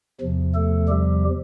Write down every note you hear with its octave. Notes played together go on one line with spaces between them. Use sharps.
E2 C3 F3
A3 A4
G3 G4